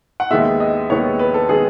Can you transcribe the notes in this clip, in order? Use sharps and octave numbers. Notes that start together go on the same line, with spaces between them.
F#5
D#2 D#3 G#3 B3 E5
D#5
D#2 D#3 G#3 B3 C#5
B4
A4
D#3 G#3 B3 G#4